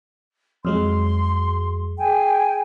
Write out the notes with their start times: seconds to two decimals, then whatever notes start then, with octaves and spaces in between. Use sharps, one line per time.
0.65 F2 F#3 G#3 C6
1.98 G#4 G5 G#5